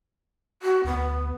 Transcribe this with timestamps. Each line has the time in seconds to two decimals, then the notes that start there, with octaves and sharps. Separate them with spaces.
0.62 F#4
0.84 D2 B3